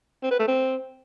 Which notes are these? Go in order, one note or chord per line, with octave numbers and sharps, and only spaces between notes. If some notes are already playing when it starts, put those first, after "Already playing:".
C4
B4
A3
C4